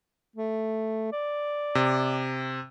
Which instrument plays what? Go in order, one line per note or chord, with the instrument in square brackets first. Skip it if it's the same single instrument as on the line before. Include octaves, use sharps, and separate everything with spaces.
[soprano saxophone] A3
D5
[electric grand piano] C3